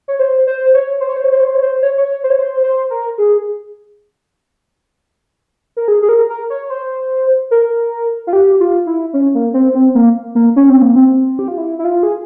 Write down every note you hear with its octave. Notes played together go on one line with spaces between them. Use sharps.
C#5
C5
C5
C#5
C5
C#5
C5
C#5
C5
C#5
C5
C#5
C5
C#5
C#5
C5
C#5
C5
C5
A#4
G#4
A#4
G#4
G#4
A#4
A#4
C#5
C5
A#4
F4
G4
F4
E4
C#4
A#3
C4
C4
A#3
A#3
C#4
C4
A#3
C4
G4
F4
E4
E4
F4
G#4